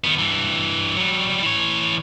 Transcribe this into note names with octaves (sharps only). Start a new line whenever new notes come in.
D#3 B3
G2 E3
F#3 G3
E3 C#5